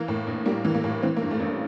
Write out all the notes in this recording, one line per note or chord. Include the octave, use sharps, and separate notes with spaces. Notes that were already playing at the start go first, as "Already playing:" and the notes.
Already playing: E3 A#3
A2
A#1
G3 A#3
E3
A#3
A2
E3 C4
A#3
G2
A3
A1
A#3